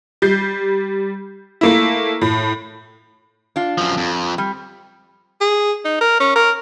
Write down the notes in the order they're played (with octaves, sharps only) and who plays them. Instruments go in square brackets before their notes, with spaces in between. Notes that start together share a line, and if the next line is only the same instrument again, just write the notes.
[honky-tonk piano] G3 G6 C7
A3 A#3 E4
A2
[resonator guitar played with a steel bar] D4 F4
[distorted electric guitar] F#2 F3
F2
[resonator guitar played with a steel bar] G3
[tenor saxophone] G#4
D#4
A#4
C#4
A#4